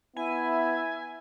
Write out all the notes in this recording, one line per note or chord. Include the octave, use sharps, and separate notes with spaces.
B3 E4 E5 G#5